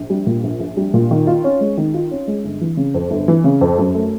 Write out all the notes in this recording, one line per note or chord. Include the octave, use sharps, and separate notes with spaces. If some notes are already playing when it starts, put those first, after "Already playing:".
Already playing: A#1
G3
A#2
A#1
A#1
G3
A#2
D#3
F4
C#4
G#3
D#3
F4
C#4
G#3
G1
E3
C#3
F2
G1
E3
C#3
F2
F#2
A3